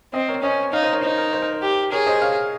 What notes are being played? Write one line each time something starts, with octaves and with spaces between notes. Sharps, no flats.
C4 C5 D#5
A#4 C#5
C#4 C5 D#5
D#4 C#5 F5
C5 D#5
A#4 C#5
D#4 C5
A#4
C5
A#4
C5
G4
G#4 A#4 C#5
C5 D#5
C#5 F5